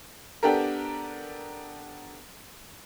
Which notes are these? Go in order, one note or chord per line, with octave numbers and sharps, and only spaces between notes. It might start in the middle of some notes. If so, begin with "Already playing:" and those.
B3 D4 G4 A4 A#4